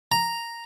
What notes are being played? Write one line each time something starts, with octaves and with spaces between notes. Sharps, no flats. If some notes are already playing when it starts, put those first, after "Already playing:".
A#5